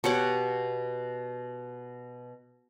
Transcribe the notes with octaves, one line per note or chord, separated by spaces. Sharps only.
B2 G4 C#5 F#5